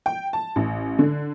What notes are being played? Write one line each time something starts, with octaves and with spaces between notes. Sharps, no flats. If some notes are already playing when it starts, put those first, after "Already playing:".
G5
A5
A1
D3